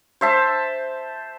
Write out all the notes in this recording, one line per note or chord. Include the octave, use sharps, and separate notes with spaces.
C5 E5 A5